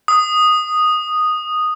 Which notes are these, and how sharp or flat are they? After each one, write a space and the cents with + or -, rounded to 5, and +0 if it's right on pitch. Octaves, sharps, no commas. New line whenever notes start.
D#6 -5